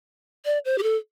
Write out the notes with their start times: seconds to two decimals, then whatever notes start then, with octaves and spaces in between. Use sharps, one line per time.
0.45 D5
0.65 C5
0.78 G4
0.83 A4